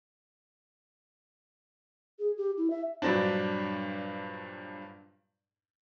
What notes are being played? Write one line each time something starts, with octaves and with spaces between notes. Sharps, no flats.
G#4
G4
E4
E5
G2 A#2 F#3 C4 D4